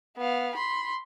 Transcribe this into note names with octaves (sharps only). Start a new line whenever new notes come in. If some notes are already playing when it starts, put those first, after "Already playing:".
B3 F5
B5 C6